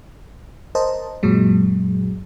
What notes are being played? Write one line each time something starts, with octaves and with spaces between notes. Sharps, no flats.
A#4 C5 D#5 A5
F#2 A#2 F#3 G#3